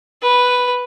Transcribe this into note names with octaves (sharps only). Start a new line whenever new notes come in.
B4